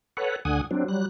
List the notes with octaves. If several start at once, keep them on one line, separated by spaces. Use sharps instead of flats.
A4 B4 C#5 F#5
D2 D3 F#5 G#5 D#6
F#3 C4 D4
F#3 G3 F#6